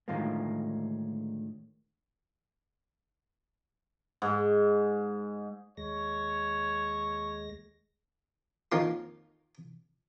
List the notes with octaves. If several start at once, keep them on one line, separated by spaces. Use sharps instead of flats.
A2 D3 D#3 F3 G#3 A#3
G#2
D#2 G#3 C#5 A#6
F2 D#3 A#3 F4 F5 C6